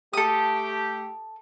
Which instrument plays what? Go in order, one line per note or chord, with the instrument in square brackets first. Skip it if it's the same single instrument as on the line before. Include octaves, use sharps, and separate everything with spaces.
[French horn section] A3 G4 [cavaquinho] A4 D#6